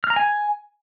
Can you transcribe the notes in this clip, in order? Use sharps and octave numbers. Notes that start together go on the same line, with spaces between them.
F6
A#5
G#5